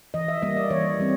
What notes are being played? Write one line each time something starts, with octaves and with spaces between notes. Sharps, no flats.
E3 D#5
E5
G3 A#3 D#5
D5
E3 C#5
G3 C4